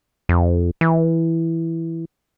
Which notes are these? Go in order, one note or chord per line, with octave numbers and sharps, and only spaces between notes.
F2
E3